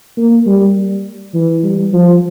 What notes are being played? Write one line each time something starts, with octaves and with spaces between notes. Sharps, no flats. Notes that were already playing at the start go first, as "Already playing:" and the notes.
A#3
G3
E3
G3
F3